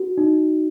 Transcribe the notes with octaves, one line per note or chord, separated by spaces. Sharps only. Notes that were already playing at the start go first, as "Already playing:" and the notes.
Already playing: F#4
D#4